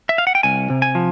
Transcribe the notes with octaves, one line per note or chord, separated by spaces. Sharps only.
E5
F5
F#5
G5
C2 G#5
C3
G#5
F3